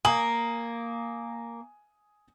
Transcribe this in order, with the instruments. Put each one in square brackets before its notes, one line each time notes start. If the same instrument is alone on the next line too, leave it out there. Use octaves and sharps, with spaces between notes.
[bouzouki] A#3 [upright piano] G#5 D#6 F#7